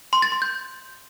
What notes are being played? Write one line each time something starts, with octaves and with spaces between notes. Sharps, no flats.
C6
A6
C6
G6